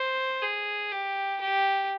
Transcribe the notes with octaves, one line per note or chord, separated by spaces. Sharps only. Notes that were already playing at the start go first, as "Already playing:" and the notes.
Already playing: C5
G#4
G4
G4